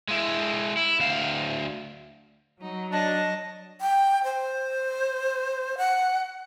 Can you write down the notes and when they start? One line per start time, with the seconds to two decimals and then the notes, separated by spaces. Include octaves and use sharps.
0.08 G#3 E4
0.77 E4
0.99 D2 F5
2.61 F#3 D#4
2.92 D4 C#5 D#5 A5
3.81 G5
4.24 C5
5.78 F#5